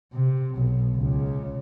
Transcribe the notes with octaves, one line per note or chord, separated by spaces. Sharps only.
C3
B1 B2
C#2 C#3